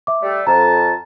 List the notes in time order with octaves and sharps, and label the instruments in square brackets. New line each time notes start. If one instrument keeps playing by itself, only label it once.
[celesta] E5 D6
[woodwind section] G3 A3
[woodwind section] F2 A5 [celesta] A#5